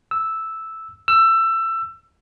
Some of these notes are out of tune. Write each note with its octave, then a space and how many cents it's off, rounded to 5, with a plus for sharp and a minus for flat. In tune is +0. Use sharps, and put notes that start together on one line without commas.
E6 -5
E6 +20